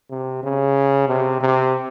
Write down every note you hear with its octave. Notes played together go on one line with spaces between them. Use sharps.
C3
C#3
C3
C3